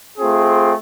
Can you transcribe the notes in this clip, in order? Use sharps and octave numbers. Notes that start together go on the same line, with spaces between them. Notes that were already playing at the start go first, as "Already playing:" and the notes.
A3 C4 F4 G#4